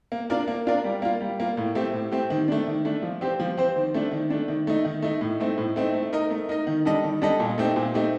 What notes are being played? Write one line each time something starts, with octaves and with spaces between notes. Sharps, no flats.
A#3
D4 F4 A#4 D5
A#3
D4 F4 A#4 D5
G3
A#3 F4
G3
A#3 F4
A2
A3 C4 G4
A2
A3 C4 G4
D#3
A3 D4
D#3
A3 D4
F3
C4 G4 C5
F3
C4 G4 C5
D#3
A3 D4
D#3
A3 D4
D#3
A3 D#4
D#3
A3 D#4
A2
A3 C4 D#4
A2
A3 C4 D#4
A3
D#4 A#4 D#5
A3
D#4 A#4 D#5
D#3
G3 D4 A4 D#5
D#3
G3 D4 A4 D#5
A#2
A3 C4 D#4 G4
A#2
A3 C4 D#4 G4